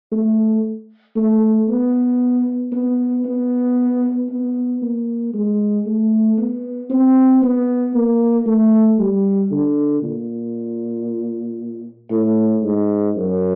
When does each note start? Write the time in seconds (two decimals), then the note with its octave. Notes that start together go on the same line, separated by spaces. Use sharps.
0.12 A3
1.16 A3
1.68 B3
2.72 B3
3.25 B3
4.29 B3
4.82 A#3
5.34 G#3
5.86 A3
6.38 B3
6.90 C4
7.42 B3
7.94 A#3
8.46 A3
8.99 G3
9.51 D3
10.02 A#2
12.11 A2
12.63 G#2
13.16 F#2